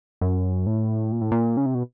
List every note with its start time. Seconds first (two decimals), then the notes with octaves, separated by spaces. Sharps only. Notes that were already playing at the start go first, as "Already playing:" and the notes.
0.21 F#2
0.66 A2
1.12 A#2
1.21 A2
1.32 A#2
1.57 C#3
1.66 C3
1.75 B2